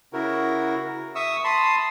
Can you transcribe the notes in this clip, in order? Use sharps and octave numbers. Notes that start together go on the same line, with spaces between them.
C#3 E4 F#4 A#4
E5 C#6 D#6 E6
A5 B5 C6 D#6